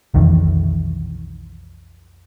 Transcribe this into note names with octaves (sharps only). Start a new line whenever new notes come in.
B1 F2 D#3 E3